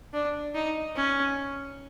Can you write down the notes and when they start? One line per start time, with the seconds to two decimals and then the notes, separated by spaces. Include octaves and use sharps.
0.14 D4
0.55 D#4
0.96 C#4